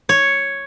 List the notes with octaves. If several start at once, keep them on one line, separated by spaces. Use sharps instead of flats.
C#5